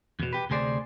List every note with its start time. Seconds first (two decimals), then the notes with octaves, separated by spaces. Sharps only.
0.20 E2 B2
0.33 G4 B4
0.50 D2 C3 G#4 C5 D5